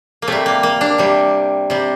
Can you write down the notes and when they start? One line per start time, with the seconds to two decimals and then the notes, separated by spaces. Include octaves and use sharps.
0.22 A#3
0.28 C3 G3 A3
0.46 A#3
0.63 A#3
0.81 D4
0.98 C3 G3
1.70 C3 G3